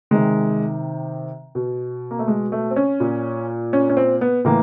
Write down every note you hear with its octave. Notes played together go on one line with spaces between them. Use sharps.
C3 D#3 G#3
B2
A#3
A3
G#3
A3
C4
C#4
A#2
C#4
C#4
C4
B3
A2 E3 A#3